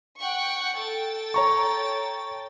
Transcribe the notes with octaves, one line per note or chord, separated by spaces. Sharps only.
F#5 G5 C#6
A4 G5 A6
C#5 A#5 C#6